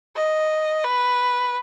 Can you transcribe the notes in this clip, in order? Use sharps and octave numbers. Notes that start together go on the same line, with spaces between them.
D#5
B4